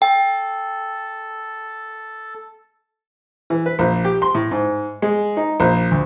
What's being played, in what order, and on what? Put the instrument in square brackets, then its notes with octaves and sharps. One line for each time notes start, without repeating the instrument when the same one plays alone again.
[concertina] A4 [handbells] G5
[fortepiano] E3
B4
A#1
G4
C6
A2
G#2
G#3
D#4
A#1
D2